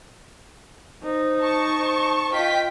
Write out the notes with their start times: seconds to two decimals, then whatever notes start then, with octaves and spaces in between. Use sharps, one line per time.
1.03 D#4 C5
1.42 A5 C#6
1.77 C5
2.33 F4 D#5 G5 B6